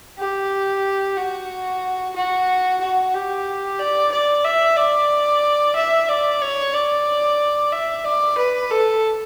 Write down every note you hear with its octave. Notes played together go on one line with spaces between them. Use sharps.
G4
F#4
F#4
F#4
G4
D5
D5
E5
D5
E5
D5
C#5
D5
E5
D5
B4
A4